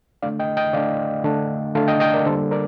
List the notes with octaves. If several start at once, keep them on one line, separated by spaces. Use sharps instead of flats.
D3 A3 D4 D5 F5
D#5 G5
D#5 G5
D3 A3 D4 D5 F5
D3 A3 D4
D3 A3 D4 F5 A5
D#5 G5
D#5 G5
A#4 D5
D3 G3 A#3 A4 C5
A#4 D5